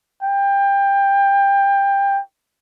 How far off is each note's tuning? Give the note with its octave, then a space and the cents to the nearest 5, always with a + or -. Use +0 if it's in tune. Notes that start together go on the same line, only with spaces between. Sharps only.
G5 +20